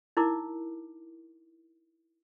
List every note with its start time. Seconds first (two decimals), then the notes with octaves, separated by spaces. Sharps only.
0.17 D#4 E4 A#4 D6